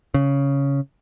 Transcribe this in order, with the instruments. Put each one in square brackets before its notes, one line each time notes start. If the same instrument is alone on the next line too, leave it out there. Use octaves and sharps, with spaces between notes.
[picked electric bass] C#3